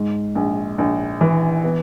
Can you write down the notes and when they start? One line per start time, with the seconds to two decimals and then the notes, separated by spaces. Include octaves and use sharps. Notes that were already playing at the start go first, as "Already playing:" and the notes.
Already playing: G#2
0.35 A#1
0.78 A#1
1.21 E3
1.64 B3